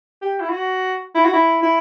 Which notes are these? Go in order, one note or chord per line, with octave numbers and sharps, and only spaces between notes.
G4
E4
F#4
E4
F#4
E4
E4